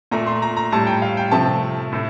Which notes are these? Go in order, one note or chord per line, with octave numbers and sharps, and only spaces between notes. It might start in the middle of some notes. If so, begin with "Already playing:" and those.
A#2 A3 A#5
C6
A#5
A#5
A2 G3 A5
G5
F5
G5
C3 F3 A3 A5
A2 A3